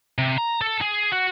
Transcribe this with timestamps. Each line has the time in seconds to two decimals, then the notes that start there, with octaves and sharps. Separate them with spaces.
0.18 C3
0.38 A#5
0.61 A4
0.81 G#4
1.12 F#4